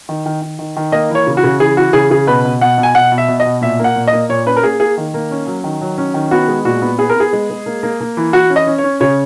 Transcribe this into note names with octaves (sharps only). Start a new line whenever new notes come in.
D#3
D#3
D#3
D#3
D#3
A#3 D#5
E3 C#5
C#3
F#4
C#3
E3 G#4
E3 F#4
C#3 G#4
C#3 G#4
B2 B4
B2
B2 F#5
B2
G#5
B2 F#5
B2
E5
B2
D#5
B2
A#2 E5
A#3
F#5
A#2
D#5
A#3
A#2 C#5
C#4 B4
A#4
A#3 G#4
A#3 G#4
D#3
A#3
C#4
F#3
D#3
F#3
C#4
D#3
B3 F#4
G#3
A#2 F#4
B3
B3 G#4
A#4
B3 G#4
G#3
G#3
A#3
A#3
A#3
E3
E3 F#4
C#4
D#5
C#4
C#5
C#4
C#3 C#5